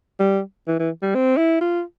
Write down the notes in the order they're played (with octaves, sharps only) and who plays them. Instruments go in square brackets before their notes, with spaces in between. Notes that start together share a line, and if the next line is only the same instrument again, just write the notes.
[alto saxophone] G3
E3
E3
G3
C4
E4
F4